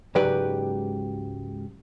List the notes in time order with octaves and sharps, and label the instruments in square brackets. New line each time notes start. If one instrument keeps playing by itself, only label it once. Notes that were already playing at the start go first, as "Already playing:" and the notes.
[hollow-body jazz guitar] C#2 G#2 F#3 G4 B4 D5